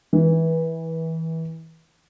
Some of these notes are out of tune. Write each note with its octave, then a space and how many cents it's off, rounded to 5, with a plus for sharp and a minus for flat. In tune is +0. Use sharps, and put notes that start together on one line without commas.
E3 -25